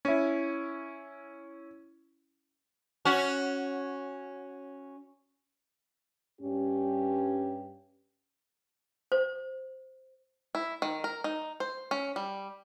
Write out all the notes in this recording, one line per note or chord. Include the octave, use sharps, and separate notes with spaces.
C#4 E4
C#4 F#4
G2 C#4 G4
C5
E4
D#3
A#4
D#4
C5
C#4
G3